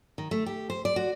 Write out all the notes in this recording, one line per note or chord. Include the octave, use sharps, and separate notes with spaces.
D#3
A3
G4
C5
D5
F#4